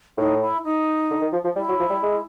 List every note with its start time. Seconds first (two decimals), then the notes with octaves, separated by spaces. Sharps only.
0.18 A2 D#4
0.41 E4
0.64 D#4
1.11 D3
1.21 D#3
1.33 F3
1.44 F3
1.56 G3 E4
1.68 F#3
1.80 F3
1.90 G3
2.03 G#3